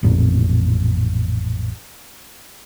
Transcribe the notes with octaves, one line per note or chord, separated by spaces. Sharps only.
A1 F2 A#2